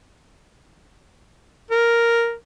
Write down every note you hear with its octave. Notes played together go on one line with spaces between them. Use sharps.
A#4